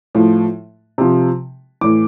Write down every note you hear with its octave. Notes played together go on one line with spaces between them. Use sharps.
A2 F3
C3 F3
A2 E3 D6